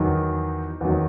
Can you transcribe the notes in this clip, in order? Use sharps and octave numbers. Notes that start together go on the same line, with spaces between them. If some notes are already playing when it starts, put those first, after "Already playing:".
Already playing: E2 D#3 F#3
E2 D#3 F#3